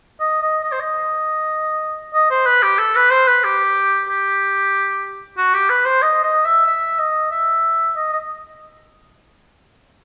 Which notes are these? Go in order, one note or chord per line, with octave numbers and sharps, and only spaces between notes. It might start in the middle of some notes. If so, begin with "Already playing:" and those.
D#5
D#5
D#5
C5
D#5
D#5
C5
B4
G4
A4
B4
C5
B4
G4
G4
F#4
G4
B4
C5
D#5
D#5
E5
E5
D#5
E5
D#5
D#5